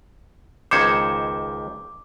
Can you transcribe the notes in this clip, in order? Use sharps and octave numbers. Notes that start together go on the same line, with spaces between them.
C#2 D#3 C5 D6 G#6 C#7 E7